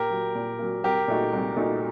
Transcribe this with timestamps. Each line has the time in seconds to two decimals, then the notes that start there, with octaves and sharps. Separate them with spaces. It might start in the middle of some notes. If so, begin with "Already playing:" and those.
Already playing: A#2 G4 A#4
0.10 F#3 A#3
0.35 A#2
0.59 F#3 A#3
0.84 C2 G4 A#4
1.08 A#2 A3 D#4 F#4
1.33 C2
1.56 A#2 A3 D#4 F#4